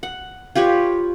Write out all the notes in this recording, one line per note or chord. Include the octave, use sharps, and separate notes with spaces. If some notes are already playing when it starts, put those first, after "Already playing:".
F#5
F4 G4 B4 C#5